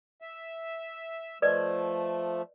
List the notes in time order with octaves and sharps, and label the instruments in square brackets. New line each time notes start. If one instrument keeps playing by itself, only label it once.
[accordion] E5
[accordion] F3 A3 [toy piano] B4 D5 D#5